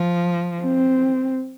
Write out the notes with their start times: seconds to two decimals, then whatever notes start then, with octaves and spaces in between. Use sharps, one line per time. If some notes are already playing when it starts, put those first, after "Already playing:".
Already playing: F3
0.63 C4